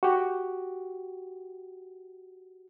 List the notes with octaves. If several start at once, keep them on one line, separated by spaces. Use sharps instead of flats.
F#4 G4